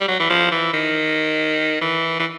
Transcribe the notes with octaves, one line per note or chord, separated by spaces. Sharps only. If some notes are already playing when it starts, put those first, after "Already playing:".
G3
F#3
E3
F3
E3
D#3
E3
E3